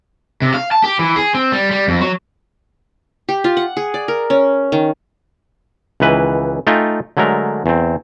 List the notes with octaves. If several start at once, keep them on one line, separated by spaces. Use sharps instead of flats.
C3
F5
A5
G4
E3
G#4
C4
G3
G3
F2
F#3
G4
F4
F#5
G#4
D5
A#4
C#4
D#3
C#2 D#3 E3 B4
A3 D#4 F4 G5 G#5
D3 F#3 G#3 A3 A#4
E2 C4